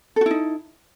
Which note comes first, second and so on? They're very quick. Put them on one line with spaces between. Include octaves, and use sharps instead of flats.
A4 F#4 E4 D#4